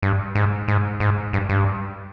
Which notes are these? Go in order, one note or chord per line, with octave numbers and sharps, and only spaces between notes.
G2
G#2
G#2
G#2
G2
G2